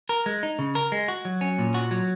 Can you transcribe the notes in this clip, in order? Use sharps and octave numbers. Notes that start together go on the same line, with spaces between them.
A#4
G#3
D#4
C#3
A#4
G#3
F#4
F#3
C#4
A#2
F#4
F#3